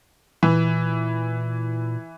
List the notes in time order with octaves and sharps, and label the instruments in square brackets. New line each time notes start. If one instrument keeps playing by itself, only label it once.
[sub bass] A#2 [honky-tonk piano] E3